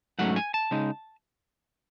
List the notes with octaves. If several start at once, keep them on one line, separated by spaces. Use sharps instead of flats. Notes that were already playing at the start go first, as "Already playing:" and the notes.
G#2 F#3 A3 C#4 F#5
G#5
A5
C#3 G#3 D#4